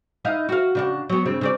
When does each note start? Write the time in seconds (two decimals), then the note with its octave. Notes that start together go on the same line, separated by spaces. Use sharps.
0.25 D#4 E4 F5
0.49 F#4 F5
0.75 C#3 D4 F#4
1.10 F#3 B3
1.26 G2 C#3 C4
1.41 C#3 C4 D5